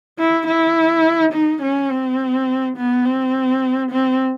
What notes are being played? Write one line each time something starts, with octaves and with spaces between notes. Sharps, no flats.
E4
E4
D#4
C#4
C4
B3
C4
C4